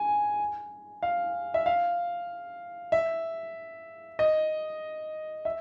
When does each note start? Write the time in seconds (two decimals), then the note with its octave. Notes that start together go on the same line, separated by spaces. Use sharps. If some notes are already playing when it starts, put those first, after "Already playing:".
Already playing: G#5
1.03 F5
1.54 E5
1.66 F5
2.92 E5
4.19 D#5
5.45 E5